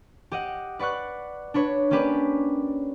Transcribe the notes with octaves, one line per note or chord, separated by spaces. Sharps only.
G4 D#5 F#5
B4 D5 F#5 C#6 F#6
D4 B4 C#5
A#3 C#4 D4 G4 B4 D5